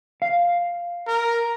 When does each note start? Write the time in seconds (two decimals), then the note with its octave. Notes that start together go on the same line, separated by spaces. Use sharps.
0.22 F5
1.07 A#4